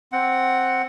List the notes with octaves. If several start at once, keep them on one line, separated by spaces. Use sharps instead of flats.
C4 F#5